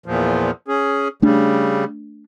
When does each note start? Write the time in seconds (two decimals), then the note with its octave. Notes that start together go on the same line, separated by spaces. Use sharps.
0.06 E2 A#2 F3
0.68 C#4 G#4
1.22 C#3 G3 A3 D4